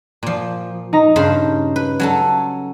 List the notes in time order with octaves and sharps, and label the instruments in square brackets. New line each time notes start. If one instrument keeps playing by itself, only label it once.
[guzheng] A#2 F3
[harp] D#4 A#5
[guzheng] G2 C#3 C5
B4
F#3 C#4 A4